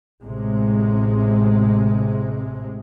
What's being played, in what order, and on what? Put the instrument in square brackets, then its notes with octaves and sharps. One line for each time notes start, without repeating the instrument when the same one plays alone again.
[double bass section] A1 A2 C3 G#3